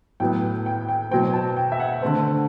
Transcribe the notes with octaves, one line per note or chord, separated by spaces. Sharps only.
A2 F#3 B3 G5
G5
G5
B2 F#3 C4 G5
A5
G5
E5
F#5
D3 A3 C4